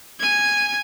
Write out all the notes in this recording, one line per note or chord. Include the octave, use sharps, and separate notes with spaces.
G#5 G#6